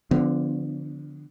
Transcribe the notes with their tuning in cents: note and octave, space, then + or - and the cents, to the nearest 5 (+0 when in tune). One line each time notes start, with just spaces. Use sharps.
D3 +0 F3 +0 B3 +30